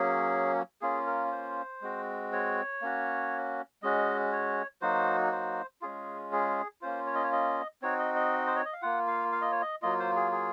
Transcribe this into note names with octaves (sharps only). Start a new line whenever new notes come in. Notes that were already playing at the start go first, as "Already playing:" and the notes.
Already playing: F#3 A#3 C#4 G#4
A#3 C#4 F4 G#4
A#4
C5
G#3 C4 F#4
C#5
A#3 C#4 F#4
G#3 C#4 F#4 D#5
C#5
F#3 A#3 D#4 F#4 C5
C5
G#3 C#4 F4 G#4
G#4
A#3 C#4 F4 C5
C#5
D#5
C#5
D#5
C4 D#4 F#4 C#5
D#5
D#5
C5
C#5
D#5
F5
A#3 F4 F#5
F5
F5
D#5
C#5
D#5
F#3 A#3 F4 D#5
C5
G#4
G#4